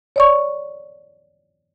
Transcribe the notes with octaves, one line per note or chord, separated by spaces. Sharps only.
C#5 D5 C#6